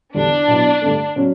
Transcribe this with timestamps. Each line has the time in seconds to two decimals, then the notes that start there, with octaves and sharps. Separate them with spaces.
0.14 E2 D3 G3 D4
0.48 B2 F#3 B3 E4
0.82 G2 D3 A3
1.16 C#3 F#3 C#4